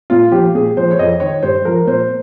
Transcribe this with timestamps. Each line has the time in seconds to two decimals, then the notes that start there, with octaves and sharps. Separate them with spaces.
0.10 A#2 F4
0.32 F3 G4
0.55 A#2 G#4
0.77 F3 C5
0.91 C#5
0.99 F2 D#5
1.20 D#3 C#5
1.43 G2 C5
1.65 F3 A#4
1.87 A#2 C5